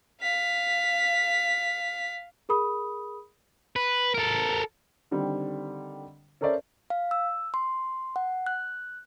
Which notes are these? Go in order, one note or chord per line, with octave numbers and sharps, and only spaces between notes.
F5 B6
G#4 A#4 B5 D#6
B4
A4 A#4
D3 D#3 G3 C4
C#4 A4 A#4 C5 D5 E5
F5
E6
C6
F#5
F#6